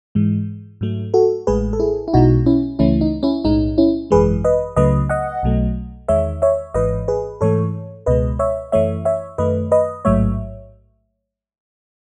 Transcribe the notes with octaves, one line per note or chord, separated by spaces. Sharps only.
G#2 E3 G#3
G#2 F#3 A3
F#4 A4
A1 A2 G#3 G#4 B4
A4
E4 G#4
E4
B1 B2 G#3 D#4 F#4
C#4 E4
C#2 C#3 E3 A3 C#4 E4
D#4
C#4 E4
B1 A2 G#3 D#4
C#4 E4
G#1 F#2 E3 G#3 G#4 B4
B4 D#5
C#2 C#3 F#3 A3 B4 D#5
D#5 F#5
B1 B2 F#3 A3
E2 D#3 G#3 C#5 E5
C#5 E5
G#1 G#2 E3 B4 D#5
G#4 B4
G#2 E3 A3 A4 C#5
C#2 B2 G#3 B4 D#5
C#5 E5
F#2 E3 A3 C#5 E5
C#5 E5
F#2 D#3 A3 B4 D#5
B4 D#5
A1 G#2 F#3 A3 C#5 E5